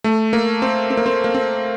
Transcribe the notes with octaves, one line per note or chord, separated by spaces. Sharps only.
A3
A#3
C4
C4
A#3
C4
A#3
C4